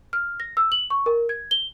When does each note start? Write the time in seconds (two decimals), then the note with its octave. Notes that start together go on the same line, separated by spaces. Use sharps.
0.13 F6
0.40 A#6
0.57 E6
0.72 F#7
0.90 C#6
1.06 A#4
1.29 G#6
1.51 G7